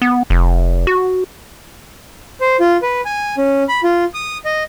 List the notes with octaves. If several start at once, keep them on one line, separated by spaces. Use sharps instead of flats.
B3
F1
F#4
C5
F4
B4
G#5
C#4
B5
F4
D#6
D#5